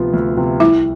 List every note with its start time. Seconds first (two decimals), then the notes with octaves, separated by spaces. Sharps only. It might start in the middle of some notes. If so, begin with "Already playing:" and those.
Already playing: D2 C3 F3 B3 F4
0.14 D2
0.37 C3 F3 B3 F4
0.60 C2 E4 E5